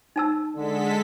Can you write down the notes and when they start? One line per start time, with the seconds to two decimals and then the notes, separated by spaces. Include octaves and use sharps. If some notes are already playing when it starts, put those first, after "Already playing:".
0.16 D#4 A5 E6
0.56 D3 G#3 A4 B6